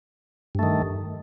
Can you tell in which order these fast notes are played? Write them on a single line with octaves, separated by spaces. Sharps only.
G2 A3 D#3